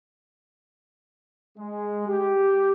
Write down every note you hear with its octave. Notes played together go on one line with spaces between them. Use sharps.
G#3
G4